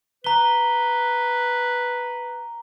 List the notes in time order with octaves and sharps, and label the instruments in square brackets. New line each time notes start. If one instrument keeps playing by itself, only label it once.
[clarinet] B4 [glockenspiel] A#5 G7